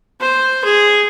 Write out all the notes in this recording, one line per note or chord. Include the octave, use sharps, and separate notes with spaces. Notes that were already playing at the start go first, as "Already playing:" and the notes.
C5
G#4